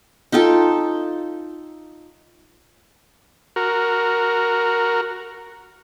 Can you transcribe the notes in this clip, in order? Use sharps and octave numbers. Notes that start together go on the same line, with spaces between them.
D#4 F4 A4 G5
F#4 A#4